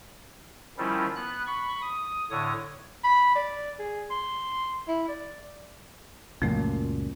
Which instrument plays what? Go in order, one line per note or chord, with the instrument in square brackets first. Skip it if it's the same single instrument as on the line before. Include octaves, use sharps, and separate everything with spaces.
[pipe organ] D#3 F3 G3 C#4 E4 F4
B3 F#6
B5 C#6
D#6
A2 D3 C#5 D#6
[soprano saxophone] B5
D5
G#4
C6
E4
D5
[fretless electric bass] C#2 F#2 A#2 [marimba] F3 A3